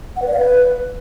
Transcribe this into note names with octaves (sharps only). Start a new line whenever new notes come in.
F#5
B4
D5
F5
B4